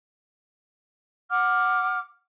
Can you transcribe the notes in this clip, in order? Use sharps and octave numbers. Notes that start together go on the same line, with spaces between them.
F#5 D6 F6